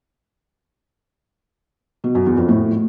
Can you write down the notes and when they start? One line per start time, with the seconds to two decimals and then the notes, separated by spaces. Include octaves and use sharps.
2.04 B2
2.15 F#2
2.26 E2
2.37 F2
2.48 A2